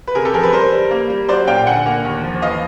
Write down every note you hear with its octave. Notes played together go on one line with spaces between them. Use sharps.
B4
C3 G#4 A#4
G4 A4
F3 G#4 A#4
A4 B4
G3 A#4 C5
G3
A#3
G3
F#3 C5 D5
A#2 F5 G5
D3 F#5 G#5
A#3
D#2
F3
E3 D#5 F5